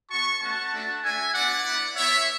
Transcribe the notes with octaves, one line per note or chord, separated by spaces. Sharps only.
B3 F#4 A5 C#6
A3 C#4 F#4 F#5 A5
A3 D4 F#4
A3 D4 F#4 E5 G#5
B3 D4 F#4 D5 F#5
B3 E4
B3 E4 C#5 E5